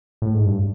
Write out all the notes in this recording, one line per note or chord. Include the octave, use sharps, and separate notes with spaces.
A2
G#2
G2